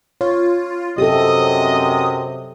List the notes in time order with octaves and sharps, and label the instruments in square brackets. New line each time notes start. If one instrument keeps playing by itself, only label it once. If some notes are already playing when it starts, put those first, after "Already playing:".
[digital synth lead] F4 [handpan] C#5
[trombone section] F#2 C3 [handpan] G4 A4 [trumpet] D#5 [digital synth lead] D#6